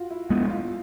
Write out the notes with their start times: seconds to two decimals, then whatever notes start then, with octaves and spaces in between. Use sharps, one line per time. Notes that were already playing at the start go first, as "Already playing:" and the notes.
Already playing: F4 F#4
0.11 E4
0.30 G#3 B3 F4
0.50 F4